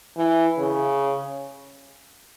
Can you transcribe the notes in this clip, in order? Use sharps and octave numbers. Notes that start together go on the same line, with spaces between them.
E3
C#3